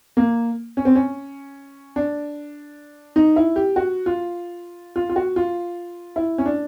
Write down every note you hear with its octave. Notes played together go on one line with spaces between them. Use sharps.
A#3
C#4
C4
C#4
D4
D#4
E4
G4
F#4
F4
F4
F4
F#4
F4
E4
C#4
D4